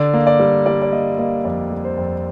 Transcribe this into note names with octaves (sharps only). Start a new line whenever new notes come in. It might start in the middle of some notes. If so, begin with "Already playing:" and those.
Already playing: D3 D5
A#3
D5
G3
G3 D5
D5
A#3 D#5
A#3 D#5
F2 D5
G3
C5
F2